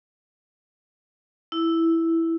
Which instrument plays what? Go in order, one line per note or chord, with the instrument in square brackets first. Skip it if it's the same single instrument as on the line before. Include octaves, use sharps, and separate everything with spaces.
[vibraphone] E4